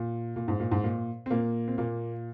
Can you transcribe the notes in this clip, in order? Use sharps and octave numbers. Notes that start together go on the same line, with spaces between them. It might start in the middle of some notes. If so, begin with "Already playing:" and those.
Already playing: A#2
A#2
G#2
A#2
G#2
A#2
C4
A#2 A#3
C4
A#2 A#3